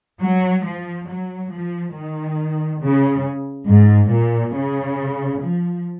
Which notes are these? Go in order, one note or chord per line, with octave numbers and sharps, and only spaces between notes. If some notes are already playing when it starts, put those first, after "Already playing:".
F#3
F3
F#3
F3
D#3
C#3
G#2
A#2
C#3
F3